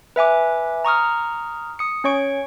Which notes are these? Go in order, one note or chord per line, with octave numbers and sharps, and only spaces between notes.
B4 E5 G#5 D6
A#5 C#6 D#6 F6
D#6 C#7
C#4 C#5 C#6 D7